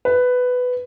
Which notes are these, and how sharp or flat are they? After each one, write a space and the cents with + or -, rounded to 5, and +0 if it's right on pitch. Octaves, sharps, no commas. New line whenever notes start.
B4 +10